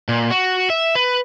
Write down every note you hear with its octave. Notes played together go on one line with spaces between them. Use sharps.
A#2
F#4
E5
B4